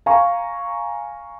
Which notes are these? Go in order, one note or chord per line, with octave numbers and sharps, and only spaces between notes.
F5 G#5 A#5 C#6